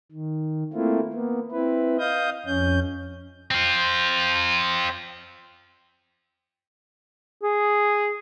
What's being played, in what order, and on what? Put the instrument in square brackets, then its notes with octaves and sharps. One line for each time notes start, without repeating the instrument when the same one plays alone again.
[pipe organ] D#3
A3 A#3 C4 E4 F4
A#3 B3
C4 E4 B4
D#5 F5 D#6 G6
F2 C#4 G6
[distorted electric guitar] C4 F4
[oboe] G#4